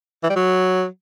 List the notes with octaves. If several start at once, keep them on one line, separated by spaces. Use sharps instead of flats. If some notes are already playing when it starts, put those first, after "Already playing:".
E3
G3
F#3